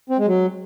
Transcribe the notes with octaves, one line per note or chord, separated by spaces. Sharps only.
C4
G#3
F#3